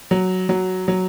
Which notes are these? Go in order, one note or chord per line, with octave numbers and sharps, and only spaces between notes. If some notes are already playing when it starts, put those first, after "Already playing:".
F#3
F#3
F#3